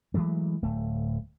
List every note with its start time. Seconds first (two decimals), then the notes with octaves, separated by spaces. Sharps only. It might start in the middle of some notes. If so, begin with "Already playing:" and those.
0.14 E3 F#3 G#3 A3
0.62 D1 A3